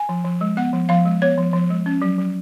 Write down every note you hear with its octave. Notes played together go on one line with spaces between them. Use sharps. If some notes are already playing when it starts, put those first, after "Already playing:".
Already playing: G#5
F3
F3
G#3
B3 F#5
F3
F3 F5
G#3
B3 C#5
F3
F3
G#3
C#4
F#3
F#3